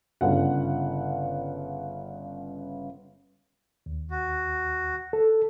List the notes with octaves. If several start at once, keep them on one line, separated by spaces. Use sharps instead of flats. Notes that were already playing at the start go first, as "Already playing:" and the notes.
G1 C#3 F#5
D#2
F#4
A4